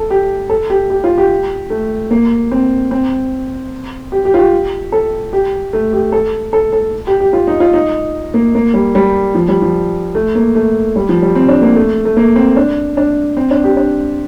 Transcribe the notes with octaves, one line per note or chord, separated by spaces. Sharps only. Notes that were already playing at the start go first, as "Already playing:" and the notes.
Already playing: A4
G4
A4
G4
G4
F4
G4
A3
A#3
C4
C4
G4
G4
F4
G4
A4
G4
A3
G4
A4
A4
A4
G4
G4
F4
D#4
F4
D#4
A#3
A#3
G3
G3
F3
G3
F3
A3
A#3
A3
G3
F3
G3
C4
D4
A#3
A3
A3
A#3
C4
D4
D4
C4
D4
G4
D4